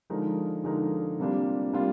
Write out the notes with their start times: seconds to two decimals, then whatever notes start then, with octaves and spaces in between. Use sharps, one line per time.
0.10 D3 F3 G#3 D#4 A#4
0.64 D3 F3 G#3 D#4 A#4
1.19 C3 G3 A#3 D4 F4
1.73 C3 G3 A#3 D4 F4